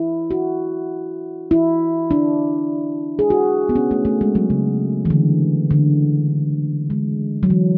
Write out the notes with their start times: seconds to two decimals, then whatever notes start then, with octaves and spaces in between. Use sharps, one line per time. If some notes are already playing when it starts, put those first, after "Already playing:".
Already playing: E4
0.31 F#4
1.51 E4
2.11 D4
3.19 G#4
3.30 F#4
3.69 B3
3.76 C#4
3.91 A3
4.05 A3
4.21 G#3
4.35 F#3
4.50 C#3
5.05 E3
5.10 D3
5.71 D3
6.90 G#3
7.43 F#3
7.50 E3